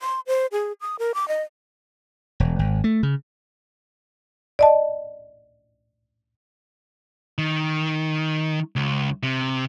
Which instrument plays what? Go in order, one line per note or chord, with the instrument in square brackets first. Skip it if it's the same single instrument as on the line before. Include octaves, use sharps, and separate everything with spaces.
[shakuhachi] C6
C5
G#4
D#6
A#4
D6
D#5
[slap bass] E1
G#1
A3
C#3
[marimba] D5 D#5 A5
[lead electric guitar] D#3
C#2
C3